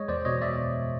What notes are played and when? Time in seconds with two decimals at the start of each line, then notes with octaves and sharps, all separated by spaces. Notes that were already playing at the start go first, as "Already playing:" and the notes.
Already playing: G#3 C#5 D#5
0.08 E2 C5 D5
0.25 B2 C#5 D#5
0.42 D5 E5